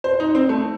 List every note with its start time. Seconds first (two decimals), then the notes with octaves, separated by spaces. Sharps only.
0.04 C5
0.20 D#4
0.35 C4
0.49 A3